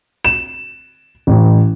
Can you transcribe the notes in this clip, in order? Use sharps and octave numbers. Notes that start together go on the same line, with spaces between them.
E7
A1